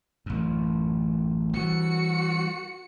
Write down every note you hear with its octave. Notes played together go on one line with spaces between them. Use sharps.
A1 F#2
E3 G3 F#4 C#7